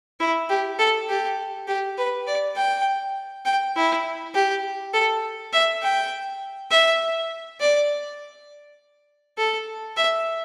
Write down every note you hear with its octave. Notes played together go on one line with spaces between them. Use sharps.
E4
G4
A4
G4
G4
B4
D5
G5
G5
E4
G4
A4
E5
G5
E5
D5
A4
E5